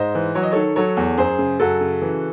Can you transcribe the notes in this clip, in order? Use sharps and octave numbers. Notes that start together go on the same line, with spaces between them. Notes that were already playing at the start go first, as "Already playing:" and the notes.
Already playing: G#2 C5 D#5
E3
F#3 C#5
D#5
D#3 A4 C#5
F#3 A4 C#5
E2
F#2 G#4 C5
C#3
F#2 F#4 A4
C#3
E3